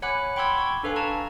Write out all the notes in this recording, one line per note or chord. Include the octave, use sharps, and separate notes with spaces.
C#5 F#5 G#5 B5 D6 F#6
G5 B5 C6 D6 E6 G#6
C#6
D4 A4 B4 F5 G#5
A5 A#5 C#6